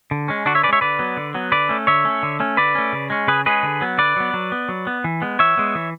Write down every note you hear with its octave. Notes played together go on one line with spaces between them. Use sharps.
D3
G#3 C#4
D3 D4 F#4
C#5 E5
C#4 B4 D5
G#3 C#5 E5
D3 B4 D5
F#3 B3
D3
F#3 B3
D3 B4 D5
A3 C#4
D3 C#5 E5
A3 C#4
D3
A3 C#4
D3 B4 D5
A3 C#4
C#3
G#3 C#4
C#3 G#4 B4
G#3 C#4 G#4 B4
D3
F#3 B3
D3 B4 D5
F#3 B3
F#3
B3
F#3
B3
E3
G#3 B3
E3 C#5 E5
G#3 B3
E3